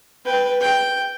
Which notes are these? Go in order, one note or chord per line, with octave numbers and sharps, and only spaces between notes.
B4 G5
G5